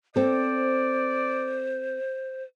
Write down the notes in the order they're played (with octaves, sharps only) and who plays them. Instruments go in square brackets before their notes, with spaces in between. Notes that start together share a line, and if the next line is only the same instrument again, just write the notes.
[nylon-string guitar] C4 A4 [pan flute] C5 [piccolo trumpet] D5